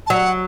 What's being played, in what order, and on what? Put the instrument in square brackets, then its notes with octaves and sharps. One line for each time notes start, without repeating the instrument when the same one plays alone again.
[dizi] A5
[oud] F#3 [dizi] F#5